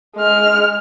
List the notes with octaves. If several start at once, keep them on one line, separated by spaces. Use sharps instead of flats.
G#3 F6